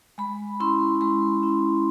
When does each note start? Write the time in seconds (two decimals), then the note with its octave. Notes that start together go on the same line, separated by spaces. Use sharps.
0.18 G#3 B5
0.60 C#4 E4 C6
1.01 G#3 C6
1.43 C#4 E4